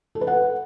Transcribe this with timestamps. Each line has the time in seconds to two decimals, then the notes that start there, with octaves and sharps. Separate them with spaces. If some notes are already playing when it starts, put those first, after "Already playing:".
0.15 A4
0.21 B4
0.27 F#5